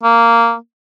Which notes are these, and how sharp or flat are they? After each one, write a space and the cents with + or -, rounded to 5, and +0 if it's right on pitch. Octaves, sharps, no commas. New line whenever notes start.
A#3 -10